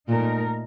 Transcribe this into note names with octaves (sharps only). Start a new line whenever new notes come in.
A#2 A3 D#4 A#4